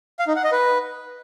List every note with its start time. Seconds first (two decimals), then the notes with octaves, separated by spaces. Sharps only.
0.19 F5
0.27 D#4
0.36 F#5
0.44 D#5
0.52 B4